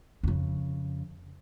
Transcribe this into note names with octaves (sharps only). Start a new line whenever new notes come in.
F2 C#3